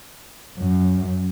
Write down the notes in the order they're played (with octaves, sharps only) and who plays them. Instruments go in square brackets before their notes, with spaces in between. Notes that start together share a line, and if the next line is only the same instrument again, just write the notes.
[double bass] F#2